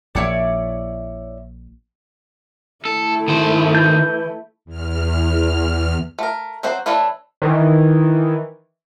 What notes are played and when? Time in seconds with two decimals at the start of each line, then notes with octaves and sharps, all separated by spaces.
0.15 A#1 E4 C#5 D5
2.85 A3 E4 A4
3.28 D#3 C5
3.74 E3 G6
4.65 E2 F6
6.19 A3 A#4
6.63 F#3 C4 F#4 C5
6.86 E3 A3 D4 A4 C#5
7.42 D#3 E3